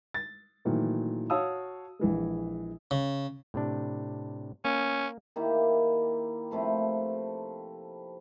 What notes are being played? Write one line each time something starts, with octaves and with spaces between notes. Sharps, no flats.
A6
A#2 D#3 E3 F#3 A3
F#4 C#5 F5 A5 D#6 E6
A#1 E3 G#3
C#3
A2 C3 D4
A#3 C#4
D#3 A#3 E4 G4
C3 F3 A3 B4